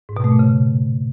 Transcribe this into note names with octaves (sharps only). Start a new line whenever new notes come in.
G#2
B2
A3
A#2
C#3